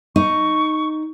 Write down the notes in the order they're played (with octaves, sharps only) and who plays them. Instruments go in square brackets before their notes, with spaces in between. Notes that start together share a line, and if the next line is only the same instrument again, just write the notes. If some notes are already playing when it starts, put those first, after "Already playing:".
[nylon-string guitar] D#4 [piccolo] C#6